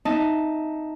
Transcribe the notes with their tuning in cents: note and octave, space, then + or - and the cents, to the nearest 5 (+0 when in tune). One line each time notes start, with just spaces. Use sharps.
D#4 +0 E5 +0 A5 +0